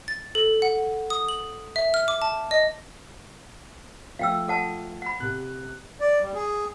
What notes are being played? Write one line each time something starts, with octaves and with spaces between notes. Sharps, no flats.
A6
A4
F#5
D#6
F#7
E5
F6
D6
A5
D#5
F3 A3 F4 F5 G5 E6
A4 F#5 A5
F#5 B5
C3 F#6
D5
G3
G#4